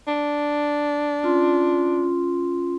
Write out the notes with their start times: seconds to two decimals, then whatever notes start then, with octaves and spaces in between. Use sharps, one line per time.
0.07 D4
1.23 C#4 F4 C6